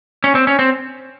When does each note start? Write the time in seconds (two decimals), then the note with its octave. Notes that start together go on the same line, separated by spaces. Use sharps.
0.24 C#4
0.35 C4
0.47 C#4
0.59 C4